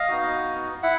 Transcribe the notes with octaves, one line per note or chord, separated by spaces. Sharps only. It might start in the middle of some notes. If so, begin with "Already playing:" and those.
Already playing: D#5 F5
B3 D#4 F#4
E4 E5 F#5